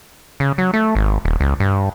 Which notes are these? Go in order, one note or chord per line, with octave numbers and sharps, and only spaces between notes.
C#3
F#3
A3
G#1
D#1
C#2
G2